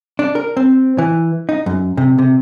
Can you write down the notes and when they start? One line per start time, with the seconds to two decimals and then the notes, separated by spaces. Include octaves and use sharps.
0.19 D4
0.35 A#4
0.57 C4
0.98 E3
1.49 D#4
1.66 F#2
1.97 C3
2.19 C3